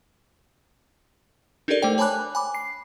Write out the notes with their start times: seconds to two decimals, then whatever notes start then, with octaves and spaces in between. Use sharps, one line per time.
1.68 D4 D#4 G4 A4 A#4 D5
1.82 A3 C5 G5
1.98 C#5 G#5 A5 B5 D6 F#6
2.35 G#5 B5 D6
2.55 C7